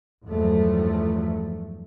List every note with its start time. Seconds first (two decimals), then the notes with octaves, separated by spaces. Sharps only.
0.25 E2 G2 F3 F#3 A3